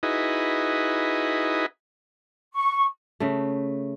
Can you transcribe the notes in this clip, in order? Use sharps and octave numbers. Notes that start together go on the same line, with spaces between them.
D#4 E4 F#4 G#4 B4 D#5
C#6
C#3 A3